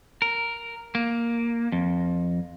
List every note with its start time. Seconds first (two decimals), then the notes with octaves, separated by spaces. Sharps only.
0.22 A#4
0.95 A#3
1.72 F2